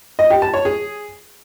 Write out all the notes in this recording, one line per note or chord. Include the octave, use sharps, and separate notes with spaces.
D#5
G4
A5
C#5
G#4